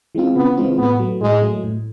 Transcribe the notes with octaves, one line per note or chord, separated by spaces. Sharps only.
E3 G#3 C4 F4
C#3 B3
E3 G#3 C4 F4
A2 B3
F#3 A3
A2 G#3
F#3 A3
A2